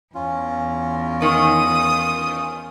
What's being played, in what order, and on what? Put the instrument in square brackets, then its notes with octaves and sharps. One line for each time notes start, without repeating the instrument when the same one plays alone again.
[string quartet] E2 [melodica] C#4 F4
[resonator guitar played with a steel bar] D#3 [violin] D#6